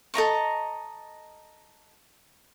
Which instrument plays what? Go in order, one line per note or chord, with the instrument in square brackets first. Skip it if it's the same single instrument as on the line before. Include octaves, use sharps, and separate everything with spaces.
[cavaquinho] A4 D#5 A#5 C#6